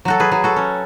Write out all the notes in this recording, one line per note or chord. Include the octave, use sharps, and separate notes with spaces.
F#3 F#4 A4
G#4 B4
F#3 G#4
F#4 A4
C#4